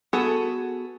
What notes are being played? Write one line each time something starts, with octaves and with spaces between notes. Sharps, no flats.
B3 F#4 G#4 A4